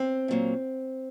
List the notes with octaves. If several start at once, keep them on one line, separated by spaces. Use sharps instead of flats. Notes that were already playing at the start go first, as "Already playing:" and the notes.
Already playing: C4
A#2 F#3 A#3